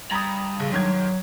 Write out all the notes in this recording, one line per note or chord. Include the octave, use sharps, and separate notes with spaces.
G2 A#5 B5 D#6
A#1 C#3
G#2 D#3 F#3 G#6